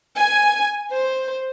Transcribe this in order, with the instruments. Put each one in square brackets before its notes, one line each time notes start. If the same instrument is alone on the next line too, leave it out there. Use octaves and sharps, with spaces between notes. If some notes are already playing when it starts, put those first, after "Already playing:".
[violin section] G#5
C5